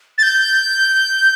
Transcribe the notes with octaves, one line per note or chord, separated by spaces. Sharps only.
A6
G6